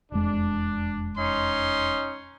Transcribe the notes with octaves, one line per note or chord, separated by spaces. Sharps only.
E1 F2 G#3 D4
C#4 D#4 C6